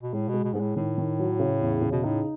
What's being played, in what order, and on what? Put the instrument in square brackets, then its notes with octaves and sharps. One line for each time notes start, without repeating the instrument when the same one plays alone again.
[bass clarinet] B2
[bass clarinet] A2 [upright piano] G#3
[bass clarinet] B2 [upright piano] G#3
[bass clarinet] B2
[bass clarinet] G#2 [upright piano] G#3
[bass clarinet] A2
[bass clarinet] A2 [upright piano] D#3
[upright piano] D#3
F#3
C#3
E2
C#3
[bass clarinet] B2
[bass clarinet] A2 [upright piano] D#4